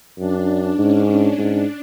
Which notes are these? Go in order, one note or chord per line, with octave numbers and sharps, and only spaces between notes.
F#2 D4
G#2 C#4
G#2 D4